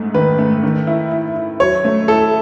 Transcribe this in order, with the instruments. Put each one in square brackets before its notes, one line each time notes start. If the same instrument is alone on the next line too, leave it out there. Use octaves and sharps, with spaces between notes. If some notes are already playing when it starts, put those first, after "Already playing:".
Already playing: [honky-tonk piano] G#2 A3
[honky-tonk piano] D#3 [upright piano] B4
[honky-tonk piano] A3
D#3
E4
E4
E4
[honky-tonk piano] F#3 [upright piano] C#5
[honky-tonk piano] A3
[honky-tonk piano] E4 [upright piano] A4